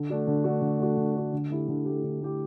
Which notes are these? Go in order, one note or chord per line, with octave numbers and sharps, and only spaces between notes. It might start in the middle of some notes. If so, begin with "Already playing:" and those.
Already playing: D3
A3 D4 F#4
D3
A3 D4 F#4
D3
A3 D4 F#4
D3
A3 D4 F#4
D3
A3 E4 G4
D3
A3 E4 G4
D3
A3 E4 G4